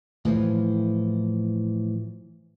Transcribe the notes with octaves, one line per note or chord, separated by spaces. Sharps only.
A2 E3 F3